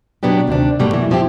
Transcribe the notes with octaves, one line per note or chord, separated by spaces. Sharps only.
B2 F#3 B3 D4 G4
D2 C3 D#3 D4
G2 B2 G3 A3 A#3
E3 F#3
B2 F3 C4 E4 G4